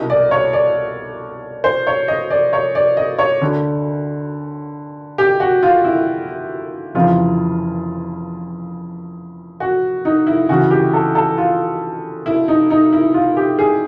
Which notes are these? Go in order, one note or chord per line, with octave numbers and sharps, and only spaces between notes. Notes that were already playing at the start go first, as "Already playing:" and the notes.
Already playing: C2 B2 D#5
D5
C#5
D5
C5
C#5
D#5
D5
C#5
D5
D#5
C#5
D2 D3
G4
F#4
F4
E4
F1 F2 C#3 E3 F4
F#4
D#4
E4
D2 C#3 E3 F#4
G4
A4
A4
F4
E4
D#4
D#4
E4
F4
G4
G#4